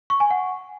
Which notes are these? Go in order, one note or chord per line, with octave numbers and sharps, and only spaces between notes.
C#6
G#5
F#5